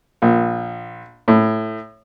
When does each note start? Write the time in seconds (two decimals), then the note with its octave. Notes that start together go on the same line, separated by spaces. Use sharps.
0.22 A#1
1.28 A2